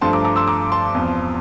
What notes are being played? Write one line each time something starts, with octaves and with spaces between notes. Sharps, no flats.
G2 F3 A3 A5 C6
A#5 D6
A#5 D6
C6 E6
A#5 D6
A5 C6
E2 C3 F3